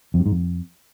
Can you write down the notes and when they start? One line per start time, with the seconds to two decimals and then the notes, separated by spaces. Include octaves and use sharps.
0.14 F2
0.20 G2
0.26 G#2
0.31 F2